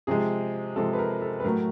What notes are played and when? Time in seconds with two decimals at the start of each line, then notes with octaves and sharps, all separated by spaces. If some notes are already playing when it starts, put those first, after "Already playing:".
0.07 C3 F3 G#3 G#4
0.76 C3 F3 G#3 A4
0.93 B4
0.99 A#4
1.22 A4
1.40 B4
1.44 A2 F#3 A3 A#4